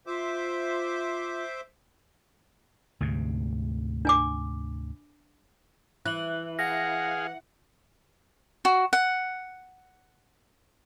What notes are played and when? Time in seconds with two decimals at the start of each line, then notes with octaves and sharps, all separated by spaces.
0.07 F4 C5 E5 D6
3.01 D2 G#2 C3
4.05 D4 G#5 D6
6.05 E3 F#6 F#7
6.59 G#4 F5 F#5 A#6
8.65 F#4
8.93 F#5